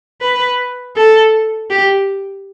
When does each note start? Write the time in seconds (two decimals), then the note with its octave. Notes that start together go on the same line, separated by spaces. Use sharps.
0.22 B4
0.96 A4
1.71 G4